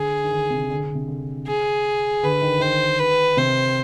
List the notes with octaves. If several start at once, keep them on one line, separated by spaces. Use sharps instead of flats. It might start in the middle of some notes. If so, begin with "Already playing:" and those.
Already playing: D3 G#4
D#3
D3
C3
D3
D3
C3
D3
G#4
D3 B4
D#3
D#3 C5
B4
C3 C5